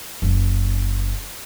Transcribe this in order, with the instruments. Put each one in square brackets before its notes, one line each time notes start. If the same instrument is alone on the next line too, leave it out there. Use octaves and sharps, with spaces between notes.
[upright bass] F#1